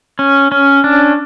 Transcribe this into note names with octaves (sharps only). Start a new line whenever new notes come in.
C#4
C#4
D4